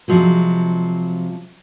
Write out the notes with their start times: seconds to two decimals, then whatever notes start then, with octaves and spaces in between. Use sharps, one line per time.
0.08 C3 F3 F#3 G#3